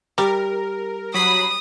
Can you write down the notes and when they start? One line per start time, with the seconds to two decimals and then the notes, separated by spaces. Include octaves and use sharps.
0.18 G3 A#4
1.14 F#3 B5 D#6 C7